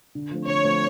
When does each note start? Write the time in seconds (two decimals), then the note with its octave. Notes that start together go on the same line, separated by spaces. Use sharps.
0.15 D3
0.31 F3 A3 C4
0.47 D3 C#5
0.64 F3 A3 C4